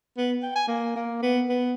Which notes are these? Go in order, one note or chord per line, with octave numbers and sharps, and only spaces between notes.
B3
G5
G#5
A#3
A#3
B3
B3